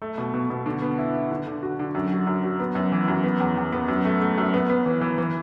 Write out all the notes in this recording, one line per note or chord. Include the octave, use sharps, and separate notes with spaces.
A3
B2
B2
B2
D3
B3
E4
E4
D3
D3
F#4
D3
F#2
F#3
F#2
F#3
B3
F#2
E3
F#2
B3
E2
E2
B3
F#2
A3
A3
F#2
B3
B3
E3
E3
E3